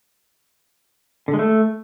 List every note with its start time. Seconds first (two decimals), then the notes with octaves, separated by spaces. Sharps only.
1.28 D3
1.34 G#3
1.39 A3